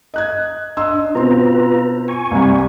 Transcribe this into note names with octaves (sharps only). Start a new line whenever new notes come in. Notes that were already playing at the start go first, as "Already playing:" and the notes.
D#5 F#6 G#6
D4 D#5 C6 E6
B2 C4 F4 B4 A#5 C6
G#5 C#6
C2 C3 G3